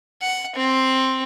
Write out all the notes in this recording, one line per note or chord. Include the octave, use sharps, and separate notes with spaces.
F#5
C4